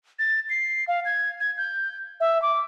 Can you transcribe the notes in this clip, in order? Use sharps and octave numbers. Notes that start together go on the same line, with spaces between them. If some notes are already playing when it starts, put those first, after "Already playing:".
A6
C7
F5
G#6
G#6
G6
E5
D6